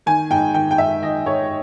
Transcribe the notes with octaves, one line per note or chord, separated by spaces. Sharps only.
D#3 G#5
G#2 G5
D#3 G5
G5
G#2 E5
D#3 D#5
G#2 C#5